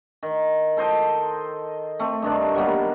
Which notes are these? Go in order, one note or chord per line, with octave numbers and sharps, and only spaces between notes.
D#3
A4 C5 D#5 G5
A3 C4
G2 D#3 D4
F#3 G3 A#3 B3